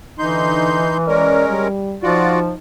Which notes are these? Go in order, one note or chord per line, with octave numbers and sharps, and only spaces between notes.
D3 E3 D#4 C6 G6
G#3 C#4 A#4 D5
G3
F3 D#4 F4 F#4 D5